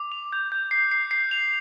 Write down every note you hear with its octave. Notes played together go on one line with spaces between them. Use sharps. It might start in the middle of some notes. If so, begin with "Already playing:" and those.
Already playing: D6
F7
G6
G6
C7
C7
C7
F7